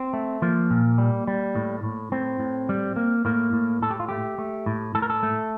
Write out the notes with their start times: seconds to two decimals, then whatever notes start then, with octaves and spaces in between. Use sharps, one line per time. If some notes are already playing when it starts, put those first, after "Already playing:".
Already playing: C4
0.13 A3
0.42 F3 A#3
0.70 A#2
0.98 G3
1.27 G3
1.56 A2
1.83 A2
2.12 A2 C4
2.40 A2
2.69 G3
2.96 A#3
3.25 A2 A#3
3.53 A2
3.82 A2 A4
3.90 G4
4.00 F4
4.09 A3 G4
4.38 A3
4.66 A2
4.95 A2 A4
5.02 A#4
5.10 A4
5.23 A3